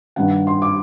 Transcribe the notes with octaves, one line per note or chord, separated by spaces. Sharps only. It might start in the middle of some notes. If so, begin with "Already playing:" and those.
G2 D#3 F#5
C6
D6